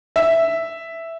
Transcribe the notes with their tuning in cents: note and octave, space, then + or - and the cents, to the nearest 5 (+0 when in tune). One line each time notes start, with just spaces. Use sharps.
E5 +0